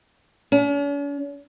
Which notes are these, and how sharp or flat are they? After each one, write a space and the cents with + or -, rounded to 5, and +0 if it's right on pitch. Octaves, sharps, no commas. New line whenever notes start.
C#4 +45